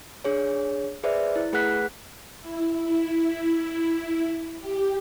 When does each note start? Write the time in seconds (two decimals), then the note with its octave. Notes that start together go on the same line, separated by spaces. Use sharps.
0.24 D4 G#4 C#5
1.03 G#4 B4 C5 D5 E5
1.36 E4
1.53 A3 G#4 B4 F#5 F#6 B6
2.41 E4
2.73 E4
4.59 G4